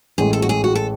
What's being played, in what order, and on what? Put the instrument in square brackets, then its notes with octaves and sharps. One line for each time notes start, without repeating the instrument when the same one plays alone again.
[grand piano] A1 A2 G#3 [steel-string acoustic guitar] G#4
[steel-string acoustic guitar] A4
F#4
G#4
F#4
A4